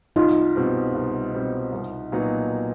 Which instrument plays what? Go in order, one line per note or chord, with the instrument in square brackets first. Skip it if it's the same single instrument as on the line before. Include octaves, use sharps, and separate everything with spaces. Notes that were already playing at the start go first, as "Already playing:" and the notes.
[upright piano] C2 [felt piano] D#4 F4
[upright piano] B2 G3 C4
C2
B2 G3 C4
C2
A#2 F#3 B3 D#4